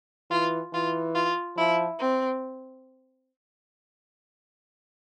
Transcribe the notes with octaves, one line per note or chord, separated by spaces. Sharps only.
E3 F4
E3 F4
F4
F3 E4
C4